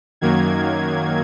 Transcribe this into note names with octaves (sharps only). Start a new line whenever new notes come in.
F#2 D#3 F#3 A#3 G#6